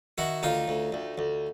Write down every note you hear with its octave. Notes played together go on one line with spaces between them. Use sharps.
D#3 E4 F#4
D2 D#4 F4
D2
D2
D2